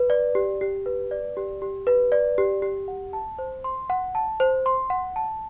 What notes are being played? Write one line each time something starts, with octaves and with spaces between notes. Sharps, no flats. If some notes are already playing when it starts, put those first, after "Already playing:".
Already playing: B4
D5
G4
G4
B4
D5
G4
G4
B4
D5
G4
G4
F#5
A5
C5
C6
F#5
A5
C5
C6
F#5
A5